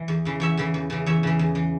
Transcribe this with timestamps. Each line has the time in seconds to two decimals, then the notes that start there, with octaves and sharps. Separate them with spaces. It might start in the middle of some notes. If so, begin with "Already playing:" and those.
Already playing: E3
0.08 E2
0.25 C#3 E3
0.40 E2 C#5 E5
0.57 C#3 E3
0.74 E2
0.90 C#3 E3
1.06 E2 C#5 E5
1.23 C#3 E3
1.39 E2
1.55 E3